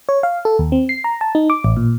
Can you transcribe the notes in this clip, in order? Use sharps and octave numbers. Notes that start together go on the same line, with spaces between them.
C#5
F5
A4
D#2
C4
C7
A#5
A5
D#4
D6
A1
A#2